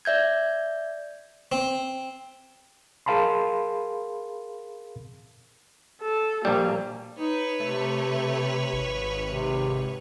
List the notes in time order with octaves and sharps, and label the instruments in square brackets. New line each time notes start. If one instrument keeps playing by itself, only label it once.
[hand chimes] D5 E5 G6 G#6
[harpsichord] C4
[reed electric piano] G#4 A#4 F5 A5 B5 C6
[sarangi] A4
[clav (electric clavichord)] A#1 G3 [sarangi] A#3
[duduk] D#4 [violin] B4 C#5
[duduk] C3 [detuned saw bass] A3
[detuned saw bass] G#1
[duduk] C3